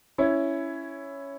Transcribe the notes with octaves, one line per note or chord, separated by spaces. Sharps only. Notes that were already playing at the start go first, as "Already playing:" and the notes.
C#4 E4